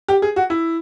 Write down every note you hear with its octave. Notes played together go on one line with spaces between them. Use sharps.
G4
G#4
F#4
E4